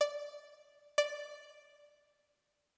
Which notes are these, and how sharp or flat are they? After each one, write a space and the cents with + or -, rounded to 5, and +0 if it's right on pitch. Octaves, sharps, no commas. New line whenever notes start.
D5 -5
D5 +0